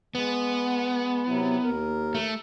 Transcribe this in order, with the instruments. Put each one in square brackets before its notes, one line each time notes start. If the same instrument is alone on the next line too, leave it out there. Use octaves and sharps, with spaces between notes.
[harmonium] G#3 [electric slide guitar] B3
[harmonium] C3 F#3 E4
D#2 A#4
[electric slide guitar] A3